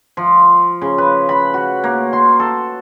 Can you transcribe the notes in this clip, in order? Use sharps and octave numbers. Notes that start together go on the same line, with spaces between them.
F3
C#3
B4
B5
F#4
A#3
C6
A4